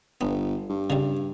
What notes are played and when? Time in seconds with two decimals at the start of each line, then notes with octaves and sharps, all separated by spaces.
0.21 G1 B3
0.70 G2
0.90 C#3 G3